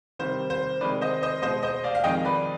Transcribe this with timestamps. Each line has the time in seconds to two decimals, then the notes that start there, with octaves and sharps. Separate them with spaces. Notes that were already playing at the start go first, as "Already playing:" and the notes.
0.19 C3 D#3 G3 C5
0.50 C5
0.81 C3 D#3 G#3 B4 D5
1.01 C5 D#5
1.23 C5 D#5
1.42 G#3 C5 D#5
1.45 B2
1.63 C5 D#5
1.84 D5 F5
1.95 F5
2.04 F2 D#3 G#3 D#5 G5
2.25 B4 D5